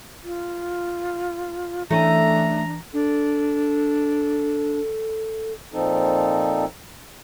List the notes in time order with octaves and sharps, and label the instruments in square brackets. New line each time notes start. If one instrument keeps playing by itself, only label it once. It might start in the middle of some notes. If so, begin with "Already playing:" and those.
[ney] F4
[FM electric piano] E3 [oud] A3 C#4 [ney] D4 [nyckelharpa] A#5
[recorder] D4 [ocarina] A4
[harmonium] A#2 F3 C4 D#4 A4